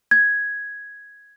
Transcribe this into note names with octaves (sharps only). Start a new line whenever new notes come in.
G#6